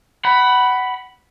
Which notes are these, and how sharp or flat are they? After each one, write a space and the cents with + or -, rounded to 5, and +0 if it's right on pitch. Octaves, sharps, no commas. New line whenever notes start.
F#5 +20 B5 +0